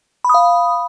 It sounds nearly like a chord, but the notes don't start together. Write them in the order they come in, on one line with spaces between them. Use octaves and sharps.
B5 D#6 F5